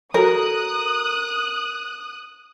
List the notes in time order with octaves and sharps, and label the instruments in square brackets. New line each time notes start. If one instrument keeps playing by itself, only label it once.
[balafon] F#4 A4 [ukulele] A#4 [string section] D#6 F#6